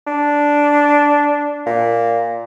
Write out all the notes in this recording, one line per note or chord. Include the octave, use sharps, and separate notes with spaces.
D4
A#2